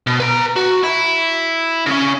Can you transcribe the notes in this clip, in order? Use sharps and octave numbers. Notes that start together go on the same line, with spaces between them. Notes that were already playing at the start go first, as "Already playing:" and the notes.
B2
B4 A#5
F#4
E4
C#3 C#4